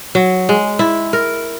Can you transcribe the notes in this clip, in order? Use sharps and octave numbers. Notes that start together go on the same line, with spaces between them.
F#3
G#3
E4
A#4